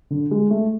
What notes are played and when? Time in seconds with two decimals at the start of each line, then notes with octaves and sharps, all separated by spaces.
0.10 D3
0.31 G#3
0.50 A3